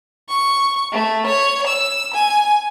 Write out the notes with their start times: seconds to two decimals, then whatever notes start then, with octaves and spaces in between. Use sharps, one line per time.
0.28 C#6
0.92 A3
1.27 C#5
1.66 E6
2.13 G#5